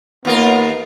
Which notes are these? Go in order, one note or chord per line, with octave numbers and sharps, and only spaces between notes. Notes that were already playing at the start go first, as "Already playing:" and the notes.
D#2 A#3 B3 F4 A#4